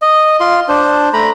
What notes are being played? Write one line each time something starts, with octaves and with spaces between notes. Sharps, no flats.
D#5
F4 C6
D4 C5
A3 A#5 B5